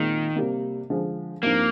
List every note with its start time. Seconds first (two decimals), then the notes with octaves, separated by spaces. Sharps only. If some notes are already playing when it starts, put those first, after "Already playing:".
Already playing: A#2 D#3 G#3 C4 F4
0.36 C3 G3 A#3
0.90 D3 F3 G#3
1.43 G2 F3 A#3 C4 D#4